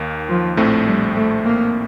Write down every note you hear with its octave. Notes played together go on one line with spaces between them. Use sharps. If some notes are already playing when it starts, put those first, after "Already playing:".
Already playing: D#2 D#3 A#3
F3
A#1 A2 A3 C4
G3
A3
A#3